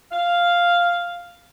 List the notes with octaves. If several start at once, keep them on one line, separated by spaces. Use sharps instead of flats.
F5